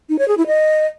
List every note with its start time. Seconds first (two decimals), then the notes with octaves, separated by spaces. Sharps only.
0.09 D#4
0.19 C#5
0.28 G#4
0.38 E4
0.47 D#5